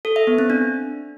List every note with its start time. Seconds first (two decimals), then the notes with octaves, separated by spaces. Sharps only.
0.05 A4
0.16 E5
0.27 B3
0.38 C4
0.50 D4